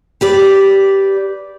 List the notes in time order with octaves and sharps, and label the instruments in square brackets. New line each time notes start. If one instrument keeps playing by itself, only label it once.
[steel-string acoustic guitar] G4 B4 D5